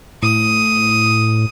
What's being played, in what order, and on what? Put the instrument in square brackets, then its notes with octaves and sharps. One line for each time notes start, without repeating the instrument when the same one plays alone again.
[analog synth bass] A2 [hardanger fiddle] D#6